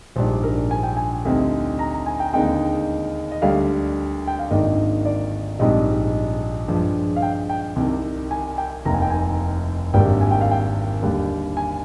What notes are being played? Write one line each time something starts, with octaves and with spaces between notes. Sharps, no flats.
A#1 G#2 G3 D4 C5
A#4
G#5
G5
G#5
D2 C3 G3 C4 D#4
A#5
A#5
G#5
G5
D#2 D3 G#3 C4 D#4 G5
D#5
D2 D3 G3 D4 F5
G5
F5
G#1 G#2 D#3 A#3 D4 D#5
D5
A#1 G#2 G3 C4 D#4 D#5
G2 F3 G#3
F5
G5
G5
C2 C3 D#3
G#5
G5
F1 D#2 D#3 A#5
G#5
G5
G#5
G#1 G#2 G3 A#3 D4 G5
G#5
G5
F5
G5
D#2 D3 G3
G#5